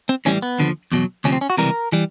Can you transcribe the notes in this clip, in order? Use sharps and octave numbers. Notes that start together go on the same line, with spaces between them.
C4
A2 E3 G3 C#4
B3
D#2 D3 F3
E2 B2 F#3
D2 C3 F3 C#4
C4
C#4
F#4
C#2 C3 E3 G3 A#4
E3 G3